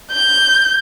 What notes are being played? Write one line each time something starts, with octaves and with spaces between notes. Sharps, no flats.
G6